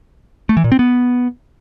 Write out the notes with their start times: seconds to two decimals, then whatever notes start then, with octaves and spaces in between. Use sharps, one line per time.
0.49 A3
0.57 E3
0.64 A#2
0.72 C4
0.79 B3